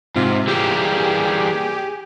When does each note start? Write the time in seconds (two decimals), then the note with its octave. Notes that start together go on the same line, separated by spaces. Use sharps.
0.16 G#2 C3 F4
0.47 E3 G3 A#3 G4 G#4